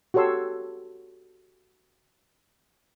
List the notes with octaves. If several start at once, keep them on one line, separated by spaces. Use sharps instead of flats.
F#4 G4 A4 C#5 C6 E6